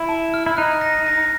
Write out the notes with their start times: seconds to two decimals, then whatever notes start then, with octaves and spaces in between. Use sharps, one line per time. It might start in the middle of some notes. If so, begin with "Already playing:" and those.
Already playing: E4
0.09 A5
0.34 F6
0.46 E4
0.57 D#4 F#6
0.81 A#6
1.07 A#6